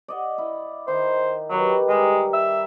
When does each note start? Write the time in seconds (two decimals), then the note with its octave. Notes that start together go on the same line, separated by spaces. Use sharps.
0.08 D5 D#5 F#5
0.38 E4
0.88 D#3 C5
1.51 D#3 F#3 G4 B4
1.89 G3 G#3 A#4
2.34 E5